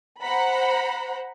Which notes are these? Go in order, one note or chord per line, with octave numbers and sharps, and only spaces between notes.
C5 F#5 A#5 B5